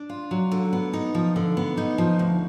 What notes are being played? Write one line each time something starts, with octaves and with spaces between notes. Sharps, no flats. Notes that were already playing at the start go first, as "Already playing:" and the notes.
Already playing: D4
F4
F#3
D3
B3
D#4
F3
D3
B3
D#4
F3
D2